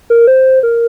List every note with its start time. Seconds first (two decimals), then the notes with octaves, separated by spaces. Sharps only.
0.10 A#4
0.27 C5
0.63 A#4